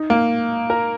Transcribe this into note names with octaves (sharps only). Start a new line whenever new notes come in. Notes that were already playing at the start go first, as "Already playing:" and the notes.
Already playing: D#4
A#3
A#4